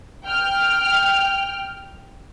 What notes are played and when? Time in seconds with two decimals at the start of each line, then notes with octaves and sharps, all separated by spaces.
0.24 G5 F6